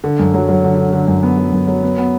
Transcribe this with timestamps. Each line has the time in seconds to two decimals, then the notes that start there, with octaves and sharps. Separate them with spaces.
0.04 D3
0.19 F#2
0.34 F#3
0.49 F#3
0.64 D3
0.78 D3
0.93 D3
1.08 F#2
1.23 B3
1.38 F#3
1.53 F#2
1.68 F#3
1.83 B3
1.98 B3